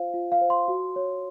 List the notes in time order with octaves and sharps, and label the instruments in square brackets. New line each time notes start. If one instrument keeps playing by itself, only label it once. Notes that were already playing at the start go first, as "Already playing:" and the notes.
Already playing: [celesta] F4 C5 F5
F4
F5
C5
C6
F#4
C#5